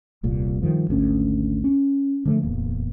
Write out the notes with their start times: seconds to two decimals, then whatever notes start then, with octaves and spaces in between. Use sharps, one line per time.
0.23 D#1 C2 A#2
0.62 G2 D#3 F3
0.88 G#1 D2 C#4
1.64 C#4
2.25 D3 F3 A3
2.42 D1 E2 A#3